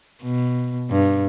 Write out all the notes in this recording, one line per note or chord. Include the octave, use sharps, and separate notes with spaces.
B2
G2